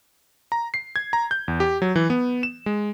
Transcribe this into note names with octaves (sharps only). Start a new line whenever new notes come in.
A#5
C7
G#6
A#5
G6
E2
G4
F#3
E3
B3
E7
G#3